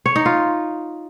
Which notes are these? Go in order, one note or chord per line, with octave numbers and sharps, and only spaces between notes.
C#5
D#4
F4